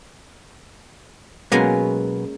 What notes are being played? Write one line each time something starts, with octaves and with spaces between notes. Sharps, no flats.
B2 F#3 G#3 A#3 B3 C#4